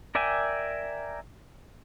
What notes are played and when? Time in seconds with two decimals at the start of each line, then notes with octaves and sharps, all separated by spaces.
0.15 A#4 D5 E5 G5 G#5